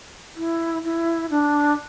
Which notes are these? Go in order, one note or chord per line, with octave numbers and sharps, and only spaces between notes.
E4
E4
D4